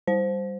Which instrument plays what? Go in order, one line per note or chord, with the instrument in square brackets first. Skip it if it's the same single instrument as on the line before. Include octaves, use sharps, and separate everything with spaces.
[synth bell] G3 C5